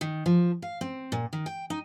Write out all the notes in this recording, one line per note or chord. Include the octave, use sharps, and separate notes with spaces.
D#3
F3
F5
C4
A#2
D#3
G5
D#4